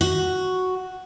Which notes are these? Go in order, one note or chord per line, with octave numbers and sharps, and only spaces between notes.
F#4